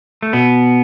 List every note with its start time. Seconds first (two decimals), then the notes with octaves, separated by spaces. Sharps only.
0.23 A3
0.33 B2 B3